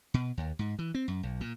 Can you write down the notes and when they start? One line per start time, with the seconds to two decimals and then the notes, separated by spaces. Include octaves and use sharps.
0.14 B2
0.37 D#2
0.59 G#2
0.79 E3
0.94 C4
1.08 F#2
1.23 B1
1.41 A#2